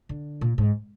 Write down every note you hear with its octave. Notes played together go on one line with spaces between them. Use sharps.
D3
A#2
G#2